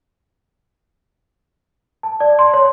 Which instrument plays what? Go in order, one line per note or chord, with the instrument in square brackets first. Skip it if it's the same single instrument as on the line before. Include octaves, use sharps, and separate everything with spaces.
[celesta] A5
D5
C6
C#5